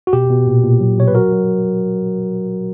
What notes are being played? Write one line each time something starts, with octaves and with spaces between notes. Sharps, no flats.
F#4
B2 G4
B2
A#2
A#2
F#3
B2 C#5
B4
F#3 F#4 A#4
F#3